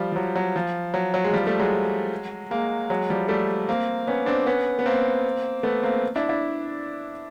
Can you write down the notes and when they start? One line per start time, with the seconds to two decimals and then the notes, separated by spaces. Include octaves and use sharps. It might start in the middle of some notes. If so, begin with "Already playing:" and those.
Already playing: F3 G3
0.12 F3
0.16 F#3
0.36 F#3
0.56 F3
0.94 F#3
1.14 F#3
1.24 G#3
1.33 F3 G3
1.46 G3 A3
1.59 F#3 G#3
2.51 G#3 A#3
2.90 F#3 G#3
3.10 F3 G3
3.28 G3 A3
3.69 A#3 C4
4.07 B3 C#4
4.26 C4 D4
4.47 B3 C#4
4.79 B3
4.86 A#3 C4
5.63 A3 B3
5.83 A#3 C4
6.16 D4 E4
6.29 D4 E4